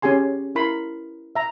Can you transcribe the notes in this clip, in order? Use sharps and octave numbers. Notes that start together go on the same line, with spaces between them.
C#4 G4 G#4 G#5 C6
E4 A#4 B5 C6
E5 A#5